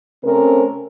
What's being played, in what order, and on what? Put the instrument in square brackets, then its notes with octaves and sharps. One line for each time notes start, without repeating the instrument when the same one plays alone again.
[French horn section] C3 A3 C4 C#4 A#4